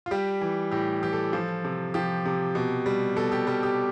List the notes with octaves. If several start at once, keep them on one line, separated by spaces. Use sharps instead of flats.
F4
G3 G4
E3
A2 G4
E3 G4
A4
F3
C3
F3 G4
C3
B2
G3
B2 A4
G4
G3 G4
G4